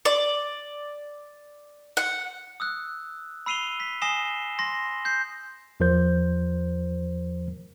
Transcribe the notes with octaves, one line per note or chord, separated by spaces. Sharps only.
D5
F#5
D#6 E6 F#6
B5 E6 C7 D#7 F7 G7
B6
G#5 D#6 A#6 C7 E7 G7
C6 A#6
G6 C7
E2 F3 A#4 C5 G6